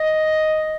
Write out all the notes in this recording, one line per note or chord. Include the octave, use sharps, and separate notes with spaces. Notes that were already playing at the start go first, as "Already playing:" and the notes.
Already playing: D#5